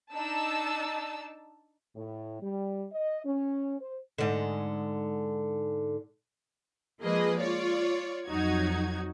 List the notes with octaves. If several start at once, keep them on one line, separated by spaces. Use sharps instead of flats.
D4 D#4 A5 E6
A2
G3
D#5
C#4
C5
G#2 D3
F3 G#3 A#3 G#4 B4 D#5
F4 C#5 D5
F2 F#3 D#4 F#4 G#6